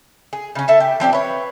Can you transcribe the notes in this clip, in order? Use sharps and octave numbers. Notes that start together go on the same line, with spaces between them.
G#4
C#3 C#4
A4 E5 A5
G4
F3 C4 D4 G4
B4 C#5